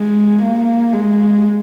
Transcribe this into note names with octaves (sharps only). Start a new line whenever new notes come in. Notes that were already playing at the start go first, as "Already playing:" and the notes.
Already playing: G#3
A#3
G#3